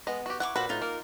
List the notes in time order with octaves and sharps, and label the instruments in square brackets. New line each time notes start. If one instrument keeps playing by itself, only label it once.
[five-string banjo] G#3 D#5 [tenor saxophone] B3
[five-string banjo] F#4 G4
[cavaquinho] E4 C#6 D6 [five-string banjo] F#5
[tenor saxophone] A#2 [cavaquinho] F#4 C5 [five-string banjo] B4
[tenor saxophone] A2 [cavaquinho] D#4 F4
[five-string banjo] A#3 [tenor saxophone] A#4